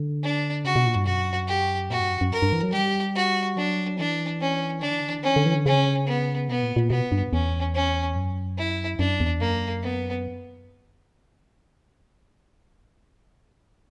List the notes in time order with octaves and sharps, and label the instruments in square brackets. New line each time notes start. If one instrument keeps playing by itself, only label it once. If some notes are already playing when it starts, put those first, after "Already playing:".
Already playing: [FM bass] D3
[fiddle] D4
[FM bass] C#3 [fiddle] F#4
[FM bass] B2
A#2
G2
[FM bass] F#2 [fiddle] F#4
[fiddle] G4
[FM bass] A#2 [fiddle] F#4
[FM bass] G2
F#2
F#2
[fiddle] A#4
[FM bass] G2
E3
F#3
[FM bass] G3 [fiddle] G4
[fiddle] F#4
[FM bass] F#3 [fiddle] D4
[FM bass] E3 [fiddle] D4
[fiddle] C#4
[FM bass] D3 [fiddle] D4
[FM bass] E3
D3
E3
D3
[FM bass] E3 [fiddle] C#4
[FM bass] D3
E3
D3
[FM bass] C#3 [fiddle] C#4
[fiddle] B3
[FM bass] B2 [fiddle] B3
[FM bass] A#2
A#2
[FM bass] B2 [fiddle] B3
[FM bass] G2
[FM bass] E2 [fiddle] C#4
[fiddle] C#4
[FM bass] F#2
[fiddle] E4
[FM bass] F#2 [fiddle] D4
[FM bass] E2
[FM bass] F#2 [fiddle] A#3
[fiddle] B3